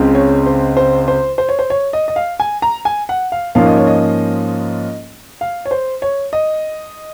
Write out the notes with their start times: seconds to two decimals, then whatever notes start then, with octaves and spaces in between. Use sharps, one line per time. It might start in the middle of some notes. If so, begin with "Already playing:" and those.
Already playing: C#2 C#3 G#3 C4
0.15 C#5
0.46 C5
0.77 C5
1.08 C5
1.38 C5
1.49 C#5
1.59 C5
1.70 C#5
1.93 D#5
2.08 D#5
2.16 F5
2.40 G#5
2.62 A#5
2.85 G#5
3.09 F#5
3.32 F5
3.55 G#2 F3 A#3 C#4 F4 F5
3.66 D#5
3.77 C#5
3.87 D#5
5.41 F5
5.65 C#5
5.71 C5
6.02 C#5
6.33 D#5